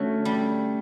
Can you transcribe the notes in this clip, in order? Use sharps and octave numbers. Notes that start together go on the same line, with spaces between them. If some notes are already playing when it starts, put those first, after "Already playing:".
Already playing: D3 A3 C#4 F#4
G3